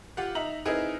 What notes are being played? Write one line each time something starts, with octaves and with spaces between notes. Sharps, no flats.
F4 G4 F5 F#5
D#4 E5 A#5 F#7
C4 D#4 E4 G#4 A#4 B4